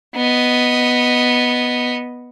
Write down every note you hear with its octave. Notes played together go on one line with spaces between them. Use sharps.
B3 D#5